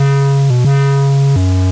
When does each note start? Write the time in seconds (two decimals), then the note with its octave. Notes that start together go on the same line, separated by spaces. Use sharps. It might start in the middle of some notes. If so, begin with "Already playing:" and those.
Already playing: C#3
0.50 B2
0.64 C#3
1.36 F#2